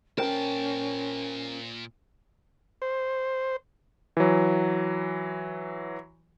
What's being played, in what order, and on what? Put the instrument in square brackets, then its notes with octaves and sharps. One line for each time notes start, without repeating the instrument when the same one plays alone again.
[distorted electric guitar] A#2 A5 [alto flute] C#4 [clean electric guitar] A#4 C5 G5
[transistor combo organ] C5
[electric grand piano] E3 F#3